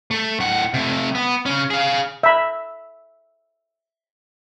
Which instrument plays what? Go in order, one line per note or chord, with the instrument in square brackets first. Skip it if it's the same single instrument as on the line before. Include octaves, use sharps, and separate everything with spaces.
[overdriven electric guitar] A3
A2 F#5
C3 A3
B3
C#3 C#4
G#4 F5
[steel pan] E5 B5